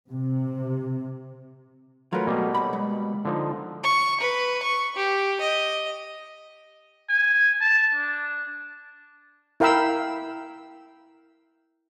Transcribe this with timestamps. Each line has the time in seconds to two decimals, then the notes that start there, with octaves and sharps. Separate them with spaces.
0.10 C3
2.13 F#3 A3 F4 A#4 B4
2.27 B2 G3 A#3
2.55 B1 B5
2.73 G#3
3.25 D3 F3 D#4
3.84 C#6
4.20 B4
4.63 C#6
4.96 G4
5.40 D#5
7.09 G#5
7.61 A5
7.95 D4
9.60 E4 A#4 F5 G5 B5 E6